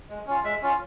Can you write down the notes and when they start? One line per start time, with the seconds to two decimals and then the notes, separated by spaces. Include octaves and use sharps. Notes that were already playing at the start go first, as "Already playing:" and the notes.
0.09 G#3
0.27 C#4 F4
0.44 G#3 E5
0.62 C#4 F4